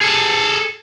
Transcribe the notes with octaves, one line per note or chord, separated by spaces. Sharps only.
G#4 A4